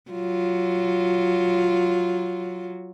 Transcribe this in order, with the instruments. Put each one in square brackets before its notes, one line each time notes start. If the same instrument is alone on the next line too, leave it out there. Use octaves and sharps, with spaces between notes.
[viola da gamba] F#3 F4